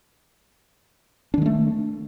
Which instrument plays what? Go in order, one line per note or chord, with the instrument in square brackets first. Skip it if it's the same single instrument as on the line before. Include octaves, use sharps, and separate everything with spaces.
[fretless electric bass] D4
D#3
G#3
A3